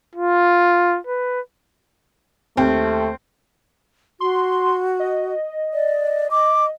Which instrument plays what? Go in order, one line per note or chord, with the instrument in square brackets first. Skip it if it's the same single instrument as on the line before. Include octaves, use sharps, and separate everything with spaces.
[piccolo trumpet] F4
B4
[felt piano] D#2 G5 [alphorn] A3 [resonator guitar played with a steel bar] C4
[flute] F#4 [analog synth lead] C6
[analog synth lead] D#5
[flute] D5
D6